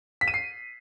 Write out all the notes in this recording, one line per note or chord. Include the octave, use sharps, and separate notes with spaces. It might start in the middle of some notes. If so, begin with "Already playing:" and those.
B6
D#7
C7